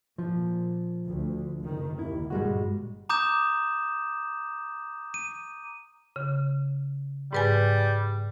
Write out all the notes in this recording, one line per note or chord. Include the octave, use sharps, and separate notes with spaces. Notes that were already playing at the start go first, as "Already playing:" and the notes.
A#2 F3
D2
F#1 D#3
D#2 E4
G1 A#2 G3 G#3 F#4
A#5 D6 D#6 G6 E7
D#7
C#3
G#2 G3 B4 G#5